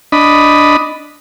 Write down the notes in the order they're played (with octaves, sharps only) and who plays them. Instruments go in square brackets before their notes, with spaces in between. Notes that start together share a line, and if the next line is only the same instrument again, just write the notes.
[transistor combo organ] D4 D#5 B5